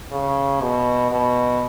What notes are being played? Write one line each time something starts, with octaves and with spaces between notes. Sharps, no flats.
C#3
B2
B2